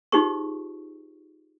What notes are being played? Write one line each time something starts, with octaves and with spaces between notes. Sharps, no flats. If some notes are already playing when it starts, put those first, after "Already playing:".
D#4 F4 G4 G#4 C5 C#6